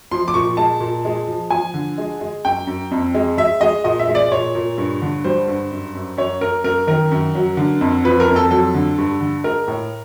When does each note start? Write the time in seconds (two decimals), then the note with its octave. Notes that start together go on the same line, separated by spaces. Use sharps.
0.11 F3 C6
0.28 D6
0.34 A#2 C#6
0.57 G#3 A5
0.80 A#2
1.05 G#3
1.27 F3
1.50 F3 G#5
1.74 D3
1.98 G#3
2.21 G#3
2.45 F#2 G5
2.67 F#2
2.91 F2
3.14 G#3
3.37 G#3 E5
3.61 G#3 D#5
3.84 A#2 D#5
3.99 E5
4.08 G#3
4.15 D5
4.32 A#2 C#5
4.55 A#2
4.78 G2
5.02 D3
5.24 G3 C5
5.48 G2
5.71 F#2
5.95 F#2
6.17 F#2 C#5
6.41 F#2 A#4
6.64 F#2 A#4
6.87 D#3 A#4
7.12 F#2
7.35 F#3
7.57 D3
7.81 F2
8.04 F3 B4
8.20 A#4
8.28 F2
8.36 A4
8.51 F#3 A4
8.74 D3
8.98 G2
9.21 D3
9.44 G#3 A#4
9.68 A2